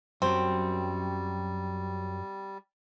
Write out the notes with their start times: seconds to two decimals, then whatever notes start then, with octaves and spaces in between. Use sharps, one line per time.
0.22 F#2 F#3 G3 C4